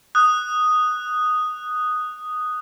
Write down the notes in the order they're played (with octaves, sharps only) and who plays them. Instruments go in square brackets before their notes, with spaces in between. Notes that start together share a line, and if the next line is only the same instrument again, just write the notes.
[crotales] D#6 F#6